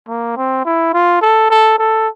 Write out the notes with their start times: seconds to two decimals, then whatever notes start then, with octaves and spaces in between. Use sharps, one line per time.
0.08 A#3
0.37 C4
0.65 E4
0.93 F4
1.22 A4
1.50 A4
1.78 A4